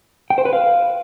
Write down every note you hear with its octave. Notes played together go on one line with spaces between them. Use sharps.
G5
C5
B4
F5